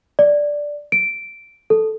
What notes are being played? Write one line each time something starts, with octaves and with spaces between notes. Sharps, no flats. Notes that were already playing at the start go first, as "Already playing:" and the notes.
D5
D7
A4